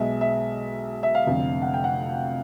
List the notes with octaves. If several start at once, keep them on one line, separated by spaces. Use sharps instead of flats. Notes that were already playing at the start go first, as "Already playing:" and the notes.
Already playing: B1 B2 G#3 E5
E5
E5
F5
F1 F2 D3
F#5
G5
F#5